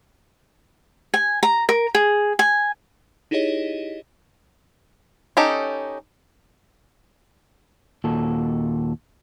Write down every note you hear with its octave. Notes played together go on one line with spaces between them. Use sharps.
G#5
A#5
A#4
G#4
G#5
D#4 E4 G4 G#4 C#5 D#5
C#4 D#4 G4 A4
D#2 A#2 F#4 A4